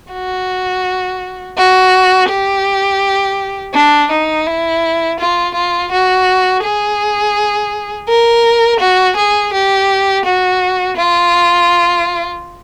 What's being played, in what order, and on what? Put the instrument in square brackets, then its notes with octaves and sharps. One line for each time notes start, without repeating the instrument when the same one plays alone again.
[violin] F#4
F#4
G4
D4
D#4
E4
F4
F4
F#4
G#4
A#4
F#4
G#4
G4
F#4
F4